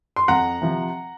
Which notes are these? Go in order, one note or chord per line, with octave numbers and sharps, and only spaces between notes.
C6
F2 F#5 A#5
C3 F3